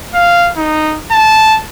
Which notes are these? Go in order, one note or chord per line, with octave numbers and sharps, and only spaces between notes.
F5
D#4
A5